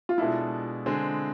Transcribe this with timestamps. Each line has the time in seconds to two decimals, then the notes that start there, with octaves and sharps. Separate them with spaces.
0.09 F4
0.18 B2 G#3 D4 E4 A4
0.86 D3 G#3 C4 G#4